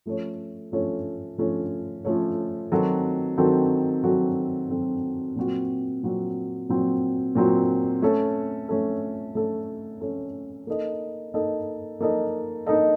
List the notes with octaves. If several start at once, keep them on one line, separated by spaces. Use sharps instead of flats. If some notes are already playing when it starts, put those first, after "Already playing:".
F3 A3 C#4 A4 C#5
F3 A3 C#4 A4 C#5
F3 A3 C#4 A4 C#5
F3 A3 C#4 A4 C#5
D#3 F#3 C4 F#4 A4
D#3 F#3 C4 F#4 A4
D#3 F#3 C4 F#4 A4
D#3 F#3 C4 F#4 A4
A#2 F#3 C4 F#4
A#2 F#3 C4 F#4
A#2 F#3 C4 F#4
A#2 F#3 C4 F#4
A3 C#4 A4
A3 C#4 A4
A3 C#4 A4
A3 C#4 A4
A#3 D#4 A4 D#5
A#3 D#4 A4 D#5
A#3 D#4 A4 D#5
A#3 D#4 A4 D#5